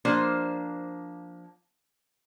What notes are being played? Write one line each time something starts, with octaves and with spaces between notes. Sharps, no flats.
F3 A#3 D4 C5